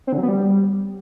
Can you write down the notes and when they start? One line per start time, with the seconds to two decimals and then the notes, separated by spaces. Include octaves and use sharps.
0.07 C4
0.13 D3
0.18 F#3
0.23 B3
0.28 G3